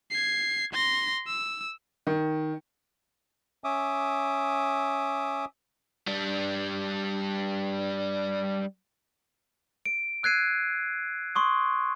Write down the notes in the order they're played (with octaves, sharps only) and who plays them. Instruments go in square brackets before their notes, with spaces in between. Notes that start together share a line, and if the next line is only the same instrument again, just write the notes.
[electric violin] G#6 C7
C6 A#6
E6
[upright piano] D#3
[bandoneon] C#4 E5 D6 D#6
[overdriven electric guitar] G3 D4
[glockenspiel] D7
E6 F#6 G#6 C7 D#7
C6 C#6 D#6